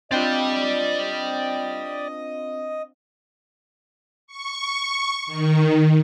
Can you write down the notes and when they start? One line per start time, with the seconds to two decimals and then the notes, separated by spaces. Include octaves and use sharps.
0.11 C4 D4 F4 D5 D#5 G5
4.27 C#6
5.27 D#3